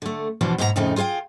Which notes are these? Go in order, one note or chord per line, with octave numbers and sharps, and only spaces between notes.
D3 A3
E2 B2 E3 F3 D4
G#2 B2 B3 F#4 A#5
F2 A2 C#3 F3 A3 D#4
F4 G#4 C5 F5 G5